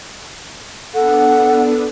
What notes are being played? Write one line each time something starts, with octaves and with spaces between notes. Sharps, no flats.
B3 D4 A4 F#5